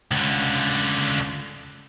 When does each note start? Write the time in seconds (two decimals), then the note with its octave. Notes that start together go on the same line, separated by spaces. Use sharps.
0.11 C#2 D3